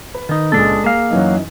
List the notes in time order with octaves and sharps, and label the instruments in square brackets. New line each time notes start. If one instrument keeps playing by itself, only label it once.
[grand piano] B4
[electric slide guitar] D#3 D#4
[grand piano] C#2 A#2 [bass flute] G#3 [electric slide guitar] D4 A4
[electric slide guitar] A#3 F5 [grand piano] G#4
[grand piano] F#2 E3 D#4 [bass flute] F#3